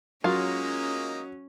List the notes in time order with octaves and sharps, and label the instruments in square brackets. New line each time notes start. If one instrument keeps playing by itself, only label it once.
[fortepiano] F#3 [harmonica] G#3 A#3 D#4 [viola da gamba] C#4 [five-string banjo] F4 A#4 F5